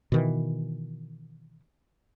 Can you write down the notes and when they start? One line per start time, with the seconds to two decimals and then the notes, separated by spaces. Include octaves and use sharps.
0.12 B2 D#3 E3